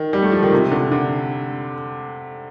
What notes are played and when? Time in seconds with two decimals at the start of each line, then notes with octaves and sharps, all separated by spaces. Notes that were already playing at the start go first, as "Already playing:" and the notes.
Already playing: D#3
0.13 G3
0.22 A3
0.32 F3
0.43 D#3
0.52 C3
0.72 D3
0.92 D3